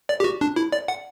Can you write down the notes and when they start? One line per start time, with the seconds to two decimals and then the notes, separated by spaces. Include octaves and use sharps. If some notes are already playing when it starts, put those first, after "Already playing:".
0.09 D5
0.20 G4
0.24 F#4
0.41 D4
0.56 E4
0.72 D5
0.88 F#5